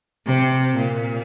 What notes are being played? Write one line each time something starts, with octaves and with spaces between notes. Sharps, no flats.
C3
A#2